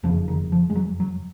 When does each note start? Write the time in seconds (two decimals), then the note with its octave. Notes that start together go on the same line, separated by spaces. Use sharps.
0.03 F#1 F2 C#3 F3
0.28 D#3
0.52 F3
0.70 G#3
0.75 F#3
1.00 F#3